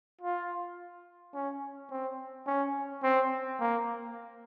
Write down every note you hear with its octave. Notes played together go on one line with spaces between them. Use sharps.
F4
C#4
C4
C#4
C4
A#3